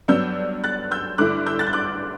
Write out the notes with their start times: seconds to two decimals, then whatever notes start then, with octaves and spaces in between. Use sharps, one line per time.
0.08 G2 F#3 B3 D4 E6 G6
0.64 F#6 A6
0.91 E6 G6
1.18 G2 D3 A3 E4 D6 F#6
1.46 E6 G6
1.59 F#6 A6
1.67 G6
1.73 D6 F#6